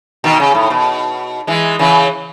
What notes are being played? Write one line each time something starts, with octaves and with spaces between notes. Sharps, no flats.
B2 D#3
C#3
A2
B2
E3 G#3
C#3 E3